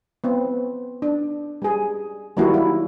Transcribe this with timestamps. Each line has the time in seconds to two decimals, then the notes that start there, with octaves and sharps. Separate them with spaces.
0.24 B3 C4
1.02 D4
1.62 G3 G#4
2.37 D#3 F#3 G3 A#3 E4 F#4
2.54 E4